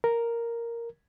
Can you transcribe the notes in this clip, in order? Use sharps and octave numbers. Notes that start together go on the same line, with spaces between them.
A#4